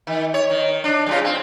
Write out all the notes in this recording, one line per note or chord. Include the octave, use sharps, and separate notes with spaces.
D#3
C#5
D#3
D4
G2 C#3 F4
C4